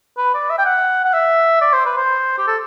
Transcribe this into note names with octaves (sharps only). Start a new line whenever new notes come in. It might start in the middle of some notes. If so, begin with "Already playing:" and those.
B4
D5
E5
G5
F#5
F#5
E5
D5
C5
B4
C5
G4
A4